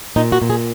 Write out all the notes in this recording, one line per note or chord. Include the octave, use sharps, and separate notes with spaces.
A#2 D#4
F#4
A#2
G#4